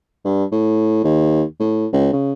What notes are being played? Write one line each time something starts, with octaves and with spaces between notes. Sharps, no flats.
G2
A2
D#2
A2
C#2
C#3